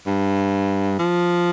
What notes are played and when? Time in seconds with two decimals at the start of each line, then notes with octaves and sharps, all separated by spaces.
0.07 G2
0.99 F3